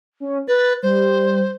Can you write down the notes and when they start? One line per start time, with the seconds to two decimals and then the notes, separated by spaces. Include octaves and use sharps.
0.20 C#4
0.48 B4 A6
0.83 G3 C5